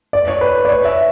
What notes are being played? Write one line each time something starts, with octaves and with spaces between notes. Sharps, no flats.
D5
C#5
B4
D5
C#5
E5